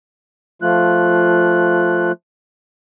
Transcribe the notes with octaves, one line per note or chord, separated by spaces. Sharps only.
F3 A3 F4 F#6